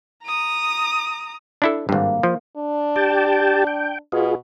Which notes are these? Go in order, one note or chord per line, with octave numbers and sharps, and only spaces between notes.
A#5 D#6
D4 E4 A4
G#1 G2 A#3
F3
D4
G4 G5 A5
G5
B2 F4 G#4